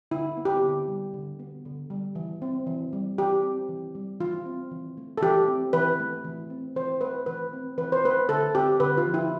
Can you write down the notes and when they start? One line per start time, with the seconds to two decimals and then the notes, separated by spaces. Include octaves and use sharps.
0.11 D3 E4
0.37 B3
0.45 G4
0.63 D3
0.88 G3
1.14 D3
1.39 B3
1.65 D3
1.90 G3
2.15 E3
2.42 C4
2.67 E3
2.93 G3
3.18 E3 G4
3.43 C4
3.69 E3
3.95 G3
4.20 E3 F4
4.45 C4
4.71 E3
4.97 A3
5.18 A4
5.22 E3 G4
5.48 C4
5.73 E3 B4
6.00 A3
6.24 E3
6.50 C4
6.75 E3 C5
7.01 A3 B4
7.26 E3 B4
7.53 C4
7.78 E3 B4
7.92 C5
8.04 A3 B4
8.29 D3 A4
8.55 C4 G4
8.80 D3 B4
8.97 F4
9.06 F3
9.14 E4